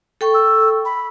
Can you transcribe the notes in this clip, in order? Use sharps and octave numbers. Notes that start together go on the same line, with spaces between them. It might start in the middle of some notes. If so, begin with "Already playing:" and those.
A4 G5 C#6
E6
B5